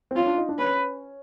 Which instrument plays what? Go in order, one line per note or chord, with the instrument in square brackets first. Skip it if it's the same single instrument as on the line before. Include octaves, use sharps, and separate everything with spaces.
[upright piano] C4
[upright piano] C#4 [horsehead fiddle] F4
[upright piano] D4
D#4
D4
[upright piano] C#4 [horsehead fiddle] B4